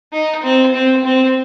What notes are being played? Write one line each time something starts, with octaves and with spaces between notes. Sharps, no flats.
D#4
C4
C4
C4